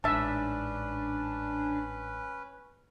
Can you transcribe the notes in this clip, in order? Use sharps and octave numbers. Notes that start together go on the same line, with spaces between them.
A1 G#2 C#4 D4 B4 E5 A5